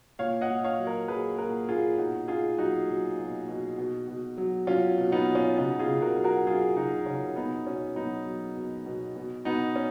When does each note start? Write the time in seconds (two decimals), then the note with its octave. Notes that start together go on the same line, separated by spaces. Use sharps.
0.19 A#2 C#5 F5
0.41 D#5 F#5
0.50 A#2
0.64 C#5 F5
0.79 F#3
0.86 A#4 C#5
1.08 F#3 G#4 B4
1.38 A#2 F#4 A#4
1.69 A#2 F4 G#4
1.98 B2 D#4 F#4
2.28 B2 F4 G#4
2.58 F#3 D#4 F#4
2.88 F#3
3.18 B2
3.48 B2
3.78 B2
4.08 B2
4.38 F#3
4.67 F#3 C#4 F4
4.98 B2
5.12 B3 D#4
5.28 B2
5.35 C#4 F4
5.57 C#3 D#4 F#4
5.79 F4 G#4
5.87 C#3
6.02 F#4 A#4
6.17 F#3
6.24 F#4 A#4
6.47 F#3 F4 G#4
6.76 C#3 D#4 F#4
7.06 C#3 C#4 F4
7.36 B2 B3 D#4
7.67 B2 C#4
7.96 F#3 B3 D#4
8.26 F#3
8.56 B2
8.86 B2
9.16 B2
9.45 B2 B3 D#4
9.76 C#4